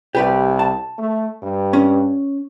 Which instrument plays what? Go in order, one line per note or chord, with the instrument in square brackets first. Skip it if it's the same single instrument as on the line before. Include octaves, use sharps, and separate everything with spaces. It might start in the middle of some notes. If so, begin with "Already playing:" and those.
[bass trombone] C2 [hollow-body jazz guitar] G4 B4 D5
[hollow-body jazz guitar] A5
[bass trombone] A3
G2
[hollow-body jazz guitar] C#4